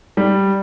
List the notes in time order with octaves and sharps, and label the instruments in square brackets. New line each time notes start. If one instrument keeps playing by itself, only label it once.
[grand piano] G3